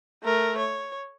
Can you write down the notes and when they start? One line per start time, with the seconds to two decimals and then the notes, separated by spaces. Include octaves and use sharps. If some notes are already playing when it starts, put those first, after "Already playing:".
0.23 A3 A#4
0.57 C#5